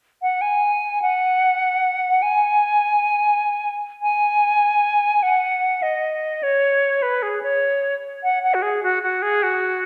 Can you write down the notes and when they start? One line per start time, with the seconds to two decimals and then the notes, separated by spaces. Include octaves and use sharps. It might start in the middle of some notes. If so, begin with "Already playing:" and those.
0.22 F#5
0.41 G#5
1.02 F#5
2.22 G#5
4.02 G#5
5.23 F#5
5.82 D#5
6.43 C#5
7.02 B4
7.22 G#4
7.42 C#5
8.23 F#5
8.43 F#5
8.54 F#4
8.62 G#4
8.83 F#4
9.03 F#4
9.22 G#4
9.43 F#4